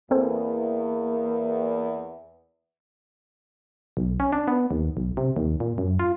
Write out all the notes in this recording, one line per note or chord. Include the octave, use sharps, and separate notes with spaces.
E2 A#3 C4 A4 C5
B1
C#4
D4
B3
D#2
B1
C3
D#2
A#2
F#2
F4